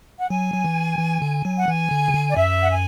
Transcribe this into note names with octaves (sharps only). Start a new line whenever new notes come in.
F#5
F#3 G#5
F#3
E3
E3
D3
F#3
F#5
E3 G#5
D3
C#3
D3
D5
F#2 E5
F#5
G#5